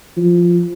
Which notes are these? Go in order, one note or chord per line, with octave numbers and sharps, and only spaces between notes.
F3